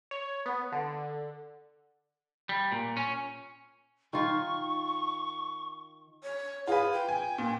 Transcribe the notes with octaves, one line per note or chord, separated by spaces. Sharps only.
C#5
B3
D3
G3
A#2
C#4
D#3 F4 C#6
C#5
F4 G#4 B4
G5
G#5
A#2